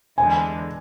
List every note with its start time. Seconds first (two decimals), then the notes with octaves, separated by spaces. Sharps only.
0.18 E2 D3 G#3 G#5